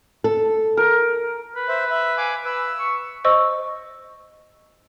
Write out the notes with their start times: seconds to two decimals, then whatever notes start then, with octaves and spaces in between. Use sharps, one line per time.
0.24 A4
0.77 A#4
1.56 B4
1.68 C5 E5
1.90 E5
2.17 F5 G#5 D6
2.45 B4 E6
2.79 C#6
3.24 C5 D#5 C#6 E6